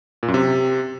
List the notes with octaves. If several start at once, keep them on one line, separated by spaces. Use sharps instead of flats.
A#2
F#2
C3